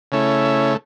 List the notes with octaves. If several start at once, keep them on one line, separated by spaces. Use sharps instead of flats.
C#3 A3 C#4 E4